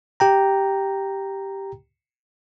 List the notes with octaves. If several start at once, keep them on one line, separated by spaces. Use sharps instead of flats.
G4 G5 A#5